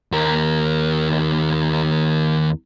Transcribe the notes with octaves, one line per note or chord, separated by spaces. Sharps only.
D#2 A#4